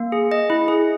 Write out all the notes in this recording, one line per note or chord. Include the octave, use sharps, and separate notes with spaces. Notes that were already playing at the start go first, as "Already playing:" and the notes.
Already playing: A#3
G#4
D#5
E4
G#4